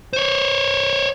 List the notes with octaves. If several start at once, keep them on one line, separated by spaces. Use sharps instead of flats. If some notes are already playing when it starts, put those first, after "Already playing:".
C5 C#5